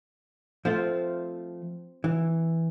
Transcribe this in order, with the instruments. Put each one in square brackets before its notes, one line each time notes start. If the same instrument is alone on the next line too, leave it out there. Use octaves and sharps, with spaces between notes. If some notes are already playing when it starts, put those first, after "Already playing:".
[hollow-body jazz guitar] F3 A3 F4 [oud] C4
[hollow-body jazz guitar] E3